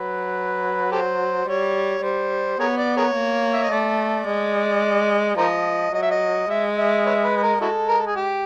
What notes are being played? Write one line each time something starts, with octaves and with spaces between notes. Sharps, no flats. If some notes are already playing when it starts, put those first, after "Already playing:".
Already playing: F#3 B4
G4 A4 C5
G3 C#5
G3 C5
B3 G#4 A#4 C#5
D5
G#4 A#4 C#5
A#3
E5
D#5
A3 D5
G#3
F3 A#4 C5 D#5
F#3 D#5
E5
D#5
G#3 E5
E5
B4 C#5 E5
B4
B4
A#4
G#3 E4 F#4 A4
A#4
A4
G#4
G4